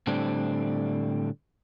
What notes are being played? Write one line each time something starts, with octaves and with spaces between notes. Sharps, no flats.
A2 D3 G3 C4 D4